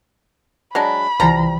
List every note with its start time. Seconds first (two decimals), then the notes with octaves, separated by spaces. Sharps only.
0.75 F#3 G#3 D4 B5
1.20 C2 E3 F3 G3 A#5